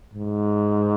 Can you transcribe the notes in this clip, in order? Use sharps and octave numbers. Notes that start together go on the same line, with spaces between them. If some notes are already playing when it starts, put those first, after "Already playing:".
G#2